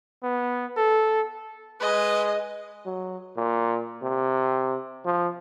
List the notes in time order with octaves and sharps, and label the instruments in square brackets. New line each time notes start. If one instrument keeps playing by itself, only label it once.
[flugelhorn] B3
A4
[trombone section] G#3 [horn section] B4 [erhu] D#5
[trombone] F#3
A#2
C3
F3